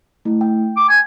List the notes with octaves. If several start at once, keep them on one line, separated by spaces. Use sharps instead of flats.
A3 E4
G5
D6
G#5